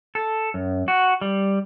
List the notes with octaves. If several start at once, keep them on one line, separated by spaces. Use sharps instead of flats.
A4
F#2
F#4
G3